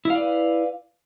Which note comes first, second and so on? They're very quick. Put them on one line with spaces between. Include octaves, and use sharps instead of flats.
E4 F5 D5 B4